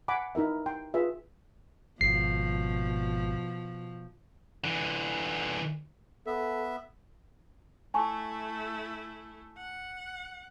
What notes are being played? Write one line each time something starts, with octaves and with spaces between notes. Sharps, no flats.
F#5 G#5 B5 D6
D#4 E4 A#4 E5
G5 C6
F4 G#4 B4 E5
G#1 B2 F3 C7
D3 E3
B3 A4 E5
A3 E4 G#5 A5 C#6
F#5